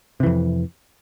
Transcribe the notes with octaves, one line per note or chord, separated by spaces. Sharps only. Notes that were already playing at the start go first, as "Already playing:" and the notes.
F2 C3 E3